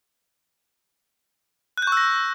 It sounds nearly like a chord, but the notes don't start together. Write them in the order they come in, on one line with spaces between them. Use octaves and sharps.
F#6 G6 C#6 E6 A#6